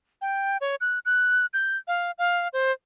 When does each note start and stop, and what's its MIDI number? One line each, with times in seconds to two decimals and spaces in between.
0.22 0.57 79
0.61 0.76 73
0.81 0.99 90
1.05 1.46 90
1.54 1.77 91
1.88 2.11 77
2.18 2.48 77
2.53 2.72 72